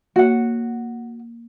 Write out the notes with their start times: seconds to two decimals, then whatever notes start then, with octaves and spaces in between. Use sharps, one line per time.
0.16 A#3 F#4 C#5 F#5